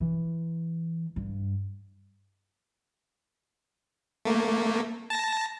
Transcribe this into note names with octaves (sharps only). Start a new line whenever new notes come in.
E3
G2
A3 A#3
A5 A#6